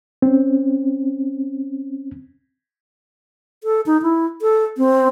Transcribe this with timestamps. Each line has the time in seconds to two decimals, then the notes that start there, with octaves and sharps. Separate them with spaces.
0.22 C4 C#4
3.64 A4
3.86 D#4
4.02 E4
4.42 A4
4.78 C4